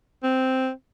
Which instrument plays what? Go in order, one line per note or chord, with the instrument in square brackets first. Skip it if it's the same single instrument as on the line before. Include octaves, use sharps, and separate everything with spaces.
[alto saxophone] C4